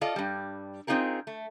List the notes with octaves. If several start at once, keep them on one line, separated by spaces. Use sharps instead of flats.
F4 A4 D5 D#5 F5
G2 G3
C4 C#4 D#4 F4 G#4 A#4
A3